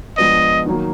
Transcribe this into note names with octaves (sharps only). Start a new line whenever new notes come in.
F3 G#3 B3 D4 D#5
D#3 F#3 A#3